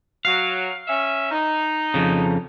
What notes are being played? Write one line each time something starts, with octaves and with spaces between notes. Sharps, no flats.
F#3 F5
C#4 E5
D#4
F2 C#3